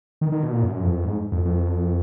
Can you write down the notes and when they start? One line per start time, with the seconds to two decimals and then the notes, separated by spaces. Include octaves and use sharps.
0.21 D#3
0.32 D#3
0.43 B2
0.52 A#2
0.63 F#2
0.83 F2
1.04 G#2
1.32 F2
1.45 F2